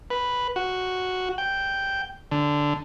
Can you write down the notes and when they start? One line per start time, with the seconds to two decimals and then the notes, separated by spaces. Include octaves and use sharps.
0.10 B4
0.56 F#4
1.38 G5
2.31 D3